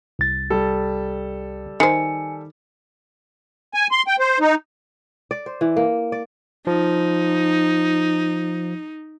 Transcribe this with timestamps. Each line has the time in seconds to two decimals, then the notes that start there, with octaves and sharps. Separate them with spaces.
0.19 C2 A6
0.50 G3 A4
1.80 D#3 C5 G#5 C#7
3.74 G#5
3.91 C6
4.07 G5
4.19 C5
4.40 D#4
5.31 D5
5.46 C5
5.61 E3
5.77 A#3
6.12 D5
6.67 F3 D#4